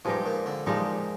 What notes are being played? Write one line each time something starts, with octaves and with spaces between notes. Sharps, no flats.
G2 F3 G#3 D#4 G4
A#2
D3
A#2 F3 G#3 D#4 G4